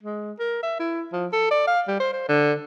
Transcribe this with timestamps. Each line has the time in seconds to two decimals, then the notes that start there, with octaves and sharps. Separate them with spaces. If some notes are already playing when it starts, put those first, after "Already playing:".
0.03 G#3
0.39 A#4
0.63 E5
0.80 E4
1.13 F3
1.33 A4
1.51 D5
1.67 F5
1.88 G3
2.00 C5
2.13 C5
2.29 D3